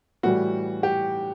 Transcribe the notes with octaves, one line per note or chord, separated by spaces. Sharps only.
A2 E3 G3 F#4
G4